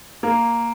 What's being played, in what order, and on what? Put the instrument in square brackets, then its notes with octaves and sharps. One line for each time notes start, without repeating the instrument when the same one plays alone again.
[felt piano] A#3